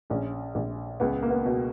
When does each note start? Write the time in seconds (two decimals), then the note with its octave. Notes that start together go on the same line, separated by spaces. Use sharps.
0.10 A#1 C#4
0.55 A#1
1.00 C#2 B3
1.22 A#3
1.30 B3
1.45 B2